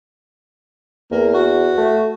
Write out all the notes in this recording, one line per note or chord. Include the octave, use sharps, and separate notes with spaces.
E2 A#3
F#4
A3